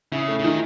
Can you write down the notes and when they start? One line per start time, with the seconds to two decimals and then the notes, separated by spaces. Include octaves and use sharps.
0.12 C#3 E4
0.28 A3
0.39 C#3
0.43 D#3 E3